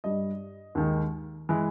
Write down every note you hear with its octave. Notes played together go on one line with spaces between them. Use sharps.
G2 G3 D#5
D#2 D#3 G#3
E3 G#3